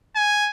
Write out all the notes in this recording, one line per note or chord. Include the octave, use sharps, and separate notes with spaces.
G#5